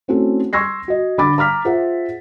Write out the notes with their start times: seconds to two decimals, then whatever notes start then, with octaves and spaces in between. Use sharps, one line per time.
0.08 A3 C4 C#4 E4 F#4 A4
0.53 C6 C#6 E6 G#6 A#6 C7
0.88 F#4 D#5
1.18 D3 B5 D6 A6
1.38 A#5 D6 F6 B6
1.65 F4 G#4 C5 E5 F#5